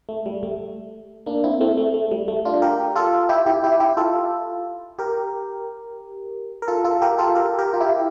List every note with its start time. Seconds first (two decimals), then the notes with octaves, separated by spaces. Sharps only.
0.09 A3
0.26 G3
0.43 A3
1.26 A#3 D4
1.44 C4 E4
1.61 A3 C4
1.77 A3
1.94 A3
2.11 G3
2.28 A3
2.45 D4 F4
2.62 G4 A#4
2.96 F4 A4
3.29 E4 G4
3.46 E4 G4
3.64 E4 G4
3.80 E4 G4
3.97 F4 A4
4.99 G4 A#4
6.62 A#4
6.68 F4 A4
6.84 F4 A4
7.02 G4 A#4
7.18 F4 A4
7.35 G4 A#4
7.59 G4 A#4
7.74 F4
7.80 E4 G4